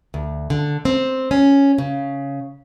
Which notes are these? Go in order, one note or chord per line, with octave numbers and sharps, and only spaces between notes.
D2
D3
C4
C#4
C#3